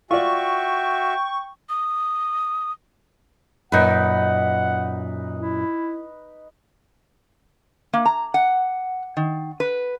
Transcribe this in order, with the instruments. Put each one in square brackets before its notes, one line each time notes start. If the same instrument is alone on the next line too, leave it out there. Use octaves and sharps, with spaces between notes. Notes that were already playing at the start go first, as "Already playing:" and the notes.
[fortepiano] F4 D5 [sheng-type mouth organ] F#4 E5 [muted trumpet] G5 [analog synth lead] C#6
[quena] D#6
[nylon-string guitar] F#2 A#2 [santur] D#4 B4 [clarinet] F#5
[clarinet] E4
[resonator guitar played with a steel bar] A#3
A#5
F#5
D#3
B4